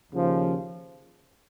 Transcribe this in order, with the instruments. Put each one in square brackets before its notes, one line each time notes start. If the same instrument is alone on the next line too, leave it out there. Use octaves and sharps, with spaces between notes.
[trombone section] D#2 C#3 F3